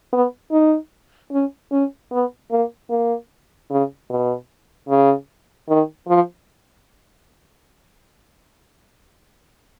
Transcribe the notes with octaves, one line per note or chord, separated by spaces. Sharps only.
B3
D#4
C#4
C#4
B3
A#3
A#3
C#3
B2
C#3
D#3
F3